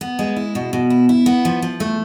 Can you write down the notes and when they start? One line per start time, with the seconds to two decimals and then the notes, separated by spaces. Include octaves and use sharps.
0.01 B3
0.19 G#3
0.36 E4
0.55 B2
0.73 B2
0.90 E4
1.09 E4
1.26 B3
1.45 F3
1.62 F3
1.80 A3